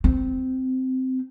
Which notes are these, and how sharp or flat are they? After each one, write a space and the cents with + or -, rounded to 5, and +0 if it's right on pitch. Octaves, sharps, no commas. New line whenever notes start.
C4 -15